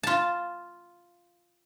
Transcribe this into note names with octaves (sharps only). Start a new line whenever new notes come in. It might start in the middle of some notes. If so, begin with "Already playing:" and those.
F4 A5